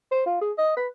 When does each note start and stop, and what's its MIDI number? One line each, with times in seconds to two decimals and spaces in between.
0.12 0.24 72
0.26 0.41 65
0.41 0.52 68
0.58 0.73 75
0.76 0.87 71